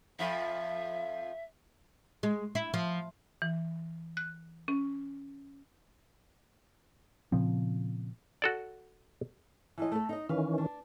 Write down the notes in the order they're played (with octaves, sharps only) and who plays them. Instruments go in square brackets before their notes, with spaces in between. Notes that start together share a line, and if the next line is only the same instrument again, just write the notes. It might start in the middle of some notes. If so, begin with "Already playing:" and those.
[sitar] F2 F3 [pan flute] E5
[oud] G#3
E4
F3
[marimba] E3
F#6
C#4
[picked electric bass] A#2 C#3 F3 C4
[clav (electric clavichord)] F#4 A4 D5
[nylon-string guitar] E3 F3 D#5
A3 A4
D#4 D#5
[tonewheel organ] D#3 E3 C#4 [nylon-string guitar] B4 F5
[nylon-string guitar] D4